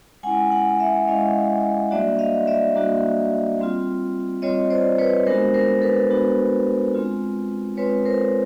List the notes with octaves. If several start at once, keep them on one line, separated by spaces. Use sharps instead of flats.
G#3 C#4 E4 F#5 G#5
F#5 G#5
E5 F#5
G#3 C#4 E4 D#5 F5
G3 A#3 D4 F#4 D5 E5
D#5 F5
D5 E5
G3 A#3 D4 F#4
G3 C4 F4
G3 C4 F4 C#5 D#5
C5 D5
B4 C#5
G#3 B3 D4 F#4 A#4 C5
A#4 C5
A4 B4
G#3 B3 D4 F#4
G#3 C4 F4
G#3 C4 F4 B4 C#5
A#4 C5